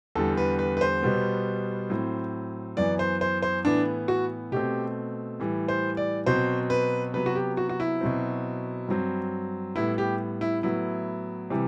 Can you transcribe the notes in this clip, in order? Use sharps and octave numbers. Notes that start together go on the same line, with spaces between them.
E2 D3 G3 A4
B4
B4
B4
C5
B2 G3 B3
A2 F#3 C4
F#2 E3 B3 D5
C5
C5
C5
A2 E3 B3 D4
F#4
B2 A3 C4 G4
A2 E3 G3
C5
D5
B2 F#3 C4 C5
B4
C3 F#3 B3 B4
F#4
G4
F#4
F#4
E4
B2 F#3 C4
G2 F#3 C4
A2 G3 B3 E4
G4
E4
A2 F#3 B3 E4
C3 E3 G3